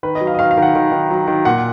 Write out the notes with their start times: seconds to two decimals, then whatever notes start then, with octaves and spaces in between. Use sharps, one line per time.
0.03 D#3 B4
0.15 D#5
0.21 F#3
0.27 F5
0.35 D#5
0.39 D#3 F5
0.51 F5
0.57 D#3 F#5
0.75 D#3
0.92 D#3
1.10 F#3
1.28 D#3
1.45 A#2 F#5